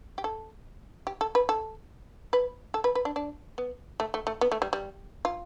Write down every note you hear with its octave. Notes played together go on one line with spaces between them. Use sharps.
G4
A4
G4
A4
B4
A4
B4
A4
B4
B4
D4
D4
B3
A3
A3
A3
B3
A3
G3
G3
F4